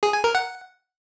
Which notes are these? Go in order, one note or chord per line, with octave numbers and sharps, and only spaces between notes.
G#4
G#5
A#4
F#5